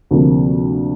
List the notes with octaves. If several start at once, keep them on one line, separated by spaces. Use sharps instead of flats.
D2 C3 F3 A#3